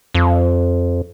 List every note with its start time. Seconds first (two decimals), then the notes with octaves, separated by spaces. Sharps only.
0.14 F2